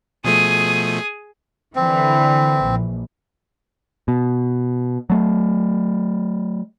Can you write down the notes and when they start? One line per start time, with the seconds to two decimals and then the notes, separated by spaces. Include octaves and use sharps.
0.25 B2 F3 A3 G#4 D#6
1.76 D3 E3 C4
2.68 A#1
4.08 B2
5.10 F#3 A3